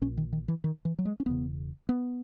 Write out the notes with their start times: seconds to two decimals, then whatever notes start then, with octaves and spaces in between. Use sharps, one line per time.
0.01 A#1 A#2 C#4
0.17 D#3
0.33 D#3
0.48 E3
0.64 D#3
0.85 E3
0.99 F#3
1.05 G#3
1.20 C#4
1.26 E1 E2 C#3 B3
1.89 B3